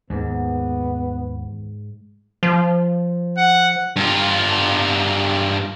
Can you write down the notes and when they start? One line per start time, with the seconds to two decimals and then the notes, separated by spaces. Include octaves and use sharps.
0.10 D#2 G#2 B3
2.43 F3
3.37 F#5
3.96 G2 F4